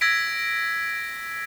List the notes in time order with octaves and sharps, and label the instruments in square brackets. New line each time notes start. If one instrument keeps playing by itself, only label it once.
[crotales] E6 G#6 A#6 B6 D7